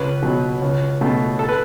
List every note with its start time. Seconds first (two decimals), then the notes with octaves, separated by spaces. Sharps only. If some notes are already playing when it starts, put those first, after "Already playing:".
Already playing: C#2 B4
0.22 B2 F#3
0.62 C#2
1.01 B2 A3
1.39 A4
1.49 B4